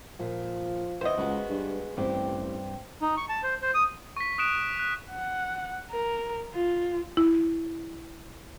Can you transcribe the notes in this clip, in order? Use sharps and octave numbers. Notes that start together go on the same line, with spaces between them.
A#2 F3
E2 E3 B3 C5 D#5
C#2 G#3 B3 F#4
G2
A1 G2 C4 G4
D#4
C#6
A5
C5
C5
D#6
C#6 B6
D#6 F#6 D7 E7
F#6
F#5
A#4
F4
E4